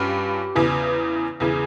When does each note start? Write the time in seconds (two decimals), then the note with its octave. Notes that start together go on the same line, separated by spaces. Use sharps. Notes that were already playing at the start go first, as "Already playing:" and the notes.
Already playing: G2 C#4 F4 G4
0.55 E2 C#3 E3
1.40 E2 C#3 E3 G#4